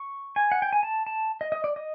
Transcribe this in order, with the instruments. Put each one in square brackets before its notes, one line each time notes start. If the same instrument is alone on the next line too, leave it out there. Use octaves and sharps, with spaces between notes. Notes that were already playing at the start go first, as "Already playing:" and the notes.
Already playing: [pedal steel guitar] C#6
G#5
F#5
G5
G#5
A5
A5
D#5
D#5
D5
D#5